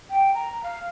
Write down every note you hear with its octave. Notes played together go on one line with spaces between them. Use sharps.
G5
A#5
F5